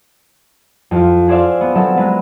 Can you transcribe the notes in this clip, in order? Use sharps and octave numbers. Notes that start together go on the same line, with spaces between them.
F2 F4
G#4 C5 D5 E5 F5
B3
F#3 C4 A4 E5
F#3 G#3 F#4 B4